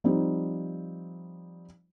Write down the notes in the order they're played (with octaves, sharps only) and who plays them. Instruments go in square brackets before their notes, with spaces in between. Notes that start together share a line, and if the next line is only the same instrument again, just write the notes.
[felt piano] F3 G3 C4 D#4